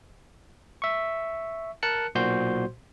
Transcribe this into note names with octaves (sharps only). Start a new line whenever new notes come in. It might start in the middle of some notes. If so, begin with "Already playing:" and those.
E5 C#6
A#4 A5 F#6 C#7
B1 A#2 F#4 C5 C6 G6